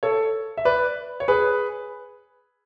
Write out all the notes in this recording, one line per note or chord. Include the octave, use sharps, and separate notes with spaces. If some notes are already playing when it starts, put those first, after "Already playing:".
A4 C#5
E5
B4 D5
C#5
G#4 B4